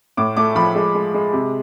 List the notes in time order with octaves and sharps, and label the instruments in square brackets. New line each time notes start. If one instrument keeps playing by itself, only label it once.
[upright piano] A2 D6
A3 D6
F3 B5
G#3
G#3
G#3
C3